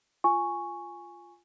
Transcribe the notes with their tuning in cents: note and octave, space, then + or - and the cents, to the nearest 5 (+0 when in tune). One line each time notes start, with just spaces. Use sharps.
F4 +0 G#5 +0 C#6 +0